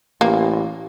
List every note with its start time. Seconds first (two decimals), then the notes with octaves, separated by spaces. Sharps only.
0.21 A1 A#3